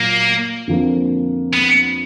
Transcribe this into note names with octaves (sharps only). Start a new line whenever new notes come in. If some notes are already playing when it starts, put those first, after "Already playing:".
Already playing: A#2 F#3 A#3
F2 D3 F3 A#3
B3